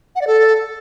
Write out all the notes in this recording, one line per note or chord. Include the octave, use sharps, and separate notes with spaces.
F#5
D5
A4